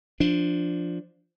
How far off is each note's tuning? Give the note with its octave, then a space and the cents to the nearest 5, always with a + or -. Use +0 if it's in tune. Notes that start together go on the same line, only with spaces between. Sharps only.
F3 -5 D4 +0